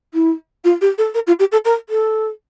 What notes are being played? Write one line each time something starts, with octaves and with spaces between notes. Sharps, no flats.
E4
F4
G4
A4
A#4
F4
G4
A4
A#4
A4